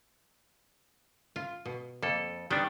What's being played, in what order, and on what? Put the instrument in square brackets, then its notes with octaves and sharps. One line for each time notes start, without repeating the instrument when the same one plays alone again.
[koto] F4
B2
[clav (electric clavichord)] F2 A4 [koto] A#3
[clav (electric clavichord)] D#3 B3 D4 [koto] G3